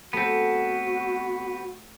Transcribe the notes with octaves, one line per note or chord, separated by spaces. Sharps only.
A3 B3 C4 F#4 G4